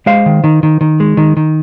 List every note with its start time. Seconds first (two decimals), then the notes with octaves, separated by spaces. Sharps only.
0.06 G#3 C5 F5
0.26 D#3
0.44 D#3
0.63 D#3
0.81 D#3
1.00 G#3
1.17 D#3
1.37 D#3